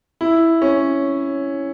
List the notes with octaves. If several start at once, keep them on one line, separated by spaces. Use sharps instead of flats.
E4
C#4